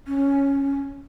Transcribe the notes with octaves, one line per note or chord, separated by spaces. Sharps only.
C#4